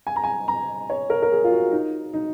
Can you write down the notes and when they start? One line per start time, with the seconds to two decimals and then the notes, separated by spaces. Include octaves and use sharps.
0.07 G#5
0.16 A#5
0.24 G#5
0.48 A#5
0.90 C#5
1.10 A#4
1.22 A#4
1.32 G#4
1.44 F4
1.52 F#4
1.72 D#4
2.13 D#4